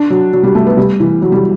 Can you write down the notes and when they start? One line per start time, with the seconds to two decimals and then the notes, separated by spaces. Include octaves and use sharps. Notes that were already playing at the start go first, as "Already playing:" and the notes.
Already playing: D4
0.10 F#3
0.33 F#3
0.44 G3
0.55 A3
0.66 B3
0.77 G3
1.00 E3
1.22 F#3
1.32 G3